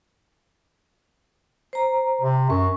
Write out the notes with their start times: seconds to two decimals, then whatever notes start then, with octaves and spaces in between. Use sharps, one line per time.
1.73 C5 A#5
2.21 C3
2.50 F#2 C#6